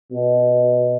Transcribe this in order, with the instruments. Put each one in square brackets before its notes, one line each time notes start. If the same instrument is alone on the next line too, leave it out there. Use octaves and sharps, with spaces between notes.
[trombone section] B2